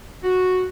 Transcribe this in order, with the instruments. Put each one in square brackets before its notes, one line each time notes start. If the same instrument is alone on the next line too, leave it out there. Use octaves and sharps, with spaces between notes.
[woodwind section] F#4